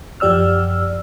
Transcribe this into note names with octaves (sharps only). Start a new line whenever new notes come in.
F#2 F3 G4 D5 E6 F6